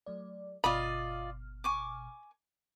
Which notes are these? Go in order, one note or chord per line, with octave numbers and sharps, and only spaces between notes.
F#3 A3 D5
G1 B2 F4 D5 D#5 B5 F6
G#5 C#6 D6